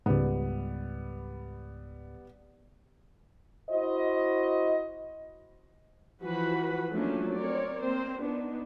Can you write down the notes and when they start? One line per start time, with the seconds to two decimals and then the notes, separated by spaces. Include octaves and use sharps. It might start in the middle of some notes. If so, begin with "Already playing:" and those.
0.06 C#2 G#2 G3 B3
3.70 E4 F#4 C5 D#5
6.22 E3 F3 F#4 B4 F#5 B5
6.91 F3 F#3 A3 A#3 C#4 D4
7.35 C4 A#4 C#5 D5
7.81 A#3 C4 C5
8.20 B3 D4 D#4